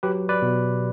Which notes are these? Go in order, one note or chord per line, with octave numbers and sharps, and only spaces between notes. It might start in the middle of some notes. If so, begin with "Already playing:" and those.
F#3 G4 B4
B4 D5
B2